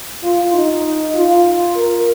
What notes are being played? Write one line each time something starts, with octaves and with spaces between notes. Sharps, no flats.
F4
D#4
F4
A#4